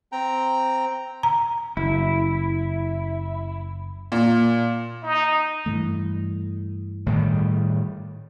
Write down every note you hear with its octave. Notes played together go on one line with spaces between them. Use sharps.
C4 G5 A#5
A#5
F#1 E4
A#2
D#4
G2 E3 A3
A2 D#3 G3